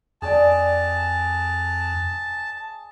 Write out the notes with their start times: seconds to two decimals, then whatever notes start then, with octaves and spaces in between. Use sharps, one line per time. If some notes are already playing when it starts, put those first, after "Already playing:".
0.22 F2 G#4 D5 G5 A5